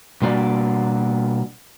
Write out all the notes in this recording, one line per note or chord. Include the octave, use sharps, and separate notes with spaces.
B2 G3 A#3 D4 F#4 D5